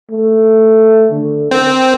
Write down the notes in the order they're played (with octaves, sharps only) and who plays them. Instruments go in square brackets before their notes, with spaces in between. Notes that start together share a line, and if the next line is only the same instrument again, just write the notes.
[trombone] A3
D3
[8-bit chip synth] C4 [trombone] A#4